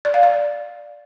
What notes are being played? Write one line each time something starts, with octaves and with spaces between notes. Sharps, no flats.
D5
F5
D5